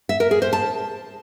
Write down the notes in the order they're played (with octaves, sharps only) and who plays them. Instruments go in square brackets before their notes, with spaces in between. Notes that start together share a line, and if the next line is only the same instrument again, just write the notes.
[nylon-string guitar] E5
A#4
G#4
C5
A5